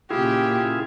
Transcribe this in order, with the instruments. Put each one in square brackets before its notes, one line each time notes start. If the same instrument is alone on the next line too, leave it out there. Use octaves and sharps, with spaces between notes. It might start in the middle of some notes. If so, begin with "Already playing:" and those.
[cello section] A#2 C#3 [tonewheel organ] E4 F4 G#4 [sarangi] G4